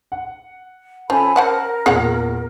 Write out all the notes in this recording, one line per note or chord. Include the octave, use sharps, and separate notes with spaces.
F#5
F3 C#4 A4 G#5 B5
A#4 C5 F#5 A5
E2 A#2 B3 G#4 C#5 F#5